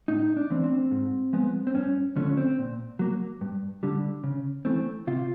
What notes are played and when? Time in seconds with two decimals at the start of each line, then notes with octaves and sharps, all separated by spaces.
0.08 A2 D#4
0.36 D4
0.50 E3 A3 C4
0.64 C4
0.91 G#2
1.33 F3 G#3 B3
1.67 C4
1.75 G2 C#4
2.16 D3 F3 A3 C#4
2.37 C4
2.58 A#2
2.99 F#3 A#3
3.41 G2
3.83 D3 G3
4.24 C#3
4.65 E3 A3 C4
5.07 C3 F4